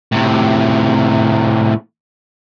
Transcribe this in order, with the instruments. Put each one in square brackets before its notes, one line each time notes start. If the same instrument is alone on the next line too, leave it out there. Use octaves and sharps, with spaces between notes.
[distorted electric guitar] A2 C3